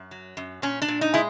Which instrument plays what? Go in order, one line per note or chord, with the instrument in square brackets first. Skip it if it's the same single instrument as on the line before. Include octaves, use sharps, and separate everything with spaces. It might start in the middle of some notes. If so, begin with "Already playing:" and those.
Already playing: [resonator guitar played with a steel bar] F#2
F#3
F#2
A#2 C#4
D4
A#2
D#4
G#3 E4